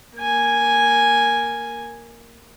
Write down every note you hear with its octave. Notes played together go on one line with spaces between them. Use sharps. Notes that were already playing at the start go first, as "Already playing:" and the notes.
A#3 G#5